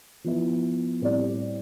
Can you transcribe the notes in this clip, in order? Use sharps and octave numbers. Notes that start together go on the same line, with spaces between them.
F3 B3 E4
A2 G3 C4 G4 D5